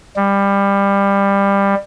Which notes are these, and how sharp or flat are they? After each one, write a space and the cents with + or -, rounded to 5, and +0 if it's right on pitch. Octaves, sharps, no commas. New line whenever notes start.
G3 +20